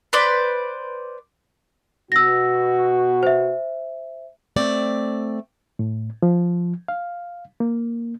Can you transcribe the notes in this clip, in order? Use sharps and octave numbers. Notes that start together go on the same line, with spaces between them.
B4 C5 D5
B2 F#4 E6 A#6
C5 E5
A3 C4 D5
A2
F3
F5
A#3